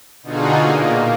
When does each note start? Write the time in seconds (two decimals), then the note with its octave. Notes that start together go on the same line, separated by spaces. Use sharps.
0.23 B2 D3 D#4 F4 F#4 G#4
0.59 A#2 A#3